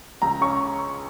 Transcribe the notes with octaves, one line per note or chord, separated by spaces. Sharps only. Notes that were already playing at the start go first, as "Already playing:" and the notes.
C#2 A#5
C#3 C#6